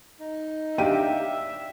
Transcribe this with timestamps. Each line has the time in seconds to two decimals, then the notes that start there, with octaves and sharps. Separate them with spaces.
0.20 D#4
0.78 D4 G4 E5 F5 G5 D#7